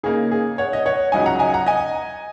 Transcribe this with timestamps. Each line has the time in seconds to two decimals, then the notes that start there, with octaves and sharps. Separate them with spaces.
0.03 C#3 A#3 D#4 G#4
0.32 G#4
0.58 C#5 F#5
0.73 D#5
0.86 C#5 F#5
1.12 C#2 C#3 F#3 D#4 D#5 G#5
1.26 F#5 A#5
1.39 D#5 G#5
1.54 F#5 A#5
1.66 D#5 G#5